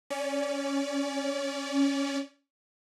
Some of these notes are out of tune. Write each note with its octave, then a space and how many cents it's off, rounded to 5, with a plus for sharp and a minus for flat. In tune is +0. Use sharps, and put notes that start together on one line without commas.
C#4 +0 D5 -30